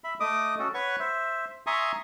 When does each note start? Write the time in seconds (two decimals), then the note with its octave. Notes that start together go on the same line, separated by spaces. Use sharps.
0.04 E5 B5
0.20 A3 D#5 D6 D#6
0.59 C#4 F#4 A4
0.74 B4 C#5 F#5 C#6
1.00 C5 E5
1.67 E5 G#5 A#5 C6 C#6 D#6